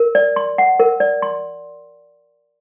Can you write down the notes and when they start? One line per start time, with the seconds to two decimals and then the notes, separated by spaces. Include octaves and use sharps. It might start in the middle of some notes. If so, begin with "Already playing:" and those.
Already playing: A#4
0.15 D5
0.36 C6
0.58 F#5
0.80 A#4
1.00 D5
1.22 C6